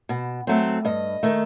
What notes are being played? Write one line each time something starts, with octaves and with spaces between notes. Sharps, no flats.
B2
F#3 A3 C4
G2 D#5
D#3 A3